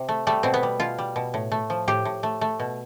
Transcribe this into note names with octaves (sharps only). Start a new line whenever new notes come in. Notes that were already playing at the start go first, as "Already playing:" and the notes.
Already playing: C3
A3
G3 A3
B2 C4
B3
G3
B2 F4
G3
B2
A2
A3
F3
A2 G4
A2
A3
A3
B2